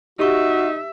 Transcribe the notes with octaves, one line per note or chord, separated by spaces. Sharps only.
D#4 F#4 G4 E5 C#6